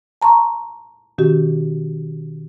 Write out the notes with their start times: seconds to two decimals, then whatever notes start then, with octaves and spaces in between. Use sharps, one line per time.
0.22 A5 A#5 C6 C#6
1.18 B2 D#3 C#4 F#4 G4